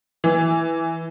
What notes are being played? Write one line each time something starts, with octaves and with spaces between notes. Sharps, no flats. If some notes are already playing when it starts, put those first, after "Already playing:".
E3